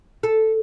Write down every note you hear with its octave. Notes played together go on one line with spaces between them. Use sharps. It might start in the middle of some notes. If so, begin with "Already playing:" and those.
A4